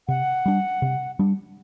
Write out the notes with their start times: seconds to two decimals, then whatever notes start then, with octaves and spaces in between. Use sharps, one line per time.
0.08 C3 F#5
0.46 G3 D4
0.82 C3
1.19 G3 D4